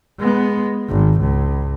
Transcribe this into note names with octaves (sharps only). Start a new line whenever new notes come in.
G#3 B3
G#1
C#2